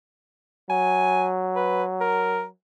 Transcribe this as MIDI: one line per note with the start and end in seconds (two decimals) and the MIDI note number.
0.70 2.52 54
0.70 1.27 80
1.56 1.83 71
2.01 2.44 70